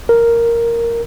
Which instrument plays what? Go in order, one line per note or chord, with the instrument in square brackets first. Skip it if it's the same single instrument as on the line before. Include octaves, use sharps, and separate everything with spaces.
[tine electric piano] A#4